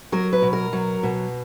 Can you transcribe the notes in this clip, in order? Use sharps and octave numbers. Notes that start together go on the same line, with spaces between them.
F#3 A#4
B4
B2
A#4
F#3
B2